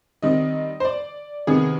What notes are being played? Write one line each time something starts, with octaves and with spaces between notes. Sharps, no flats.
D#3 G3 C4 D#5
C5
D5
C3 D#3 B3 G#4